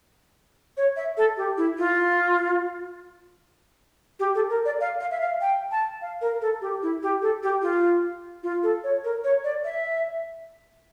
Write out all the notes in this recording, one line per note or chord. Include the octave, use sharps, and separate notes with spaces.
C#5
E5
A4
G4
E4
F4
G4
A4
A#4
D5
F5
F5
E5
F5
G5
A5
F5
A#4
A4
G4
E4
G4
A4
G4
F4
F4
A4
C#5
A#4
C#5
D5
E5